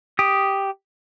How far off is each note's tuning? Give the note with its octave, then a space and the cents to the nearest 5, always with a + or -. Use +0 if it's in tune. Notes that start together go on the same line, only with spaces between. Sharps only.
G4 +0 D#6 +0